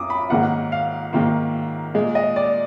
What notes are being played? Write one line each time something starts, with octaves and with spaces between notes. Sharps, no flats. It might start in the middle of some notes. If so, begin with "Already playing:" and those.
Already playing: F#2 D6 D#6
B5
G#2 D#3 A#3 F#5
F5
G#2 D#3 A#3
A#2 G#3
D#5
D5